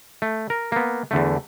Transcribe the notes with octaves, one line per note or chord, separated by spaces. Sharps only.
A3
A#4
A#3 B3
E2 D3 A3